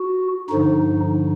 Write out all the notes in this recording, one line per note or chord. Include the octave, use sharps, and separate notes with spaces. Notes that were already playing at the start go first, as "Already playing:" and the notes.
Already playing: F#4
G2 D3 F3 D#4